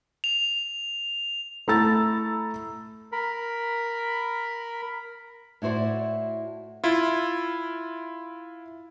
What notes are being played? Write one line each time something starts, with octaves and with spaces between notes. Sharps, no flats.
F7
A3 E4 A#5 E6 A6
A#4 B5
A2 E4 F#4 C5 D5
E4 F4